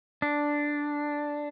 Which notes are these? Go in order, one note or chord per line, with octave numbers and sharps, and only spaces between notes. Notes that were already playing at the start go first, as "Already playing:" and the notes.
D4